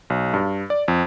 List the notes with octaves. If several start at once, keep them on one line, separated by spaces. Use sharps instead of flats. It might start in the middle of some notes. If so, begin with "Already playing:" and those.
B1
G2
D5
F2